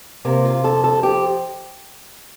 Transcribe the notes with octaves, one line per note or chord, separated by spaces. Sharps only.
C3 A#3
F4
F2 A4
A4
F3 G4